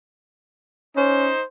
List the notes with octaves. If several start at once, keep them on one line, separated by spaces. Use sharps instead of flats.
C#4 D#4 C5